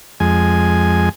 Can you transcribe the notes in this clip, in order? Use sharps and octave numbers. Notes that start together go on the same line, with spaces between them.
F2 G#3 G#5